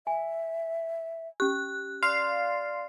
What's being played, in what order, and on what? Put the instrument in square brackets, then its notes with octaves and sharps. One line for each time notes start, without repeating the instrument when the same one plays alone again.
[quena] E5 [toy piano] G#5
[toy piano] C#4 G4 [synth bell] F#6
[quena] D5 [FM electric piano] F5 [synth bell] C6 C7